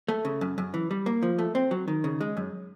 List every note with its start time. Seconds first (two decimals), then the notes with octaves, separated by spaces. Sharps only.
0.08 A3
0.25 C#3
0.41 F#2
0.58 F#2
0.74 E3
0.91 G3
1.06 A#3
1.23 F3
1.39 A3
1.55 C4
1.71 F#3
1.88 D#3
2.04 C#3
2.21 G#3
2.37 F#2